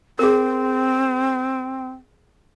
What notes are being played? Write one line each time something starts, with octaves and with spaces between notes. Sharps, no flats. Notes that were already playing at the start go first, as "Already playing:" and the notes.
C4 G#4 A#4